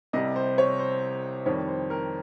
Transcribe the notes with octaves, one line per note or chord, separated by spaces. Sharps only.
C2 C3 G3 D#5
C5
C#5
C5
F2 D#3 G3 C#5
C5
A#4